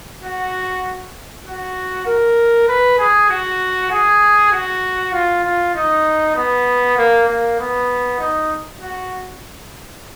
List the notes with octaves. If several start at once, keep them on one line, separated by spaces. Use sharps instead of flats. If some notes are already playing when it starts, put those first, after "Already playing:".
F#4
F#4
A#4
B4
G#4
F#4
G#4
F#4
F4
F4
D#4
B3
A#3
A#3
B3
D#4
F#4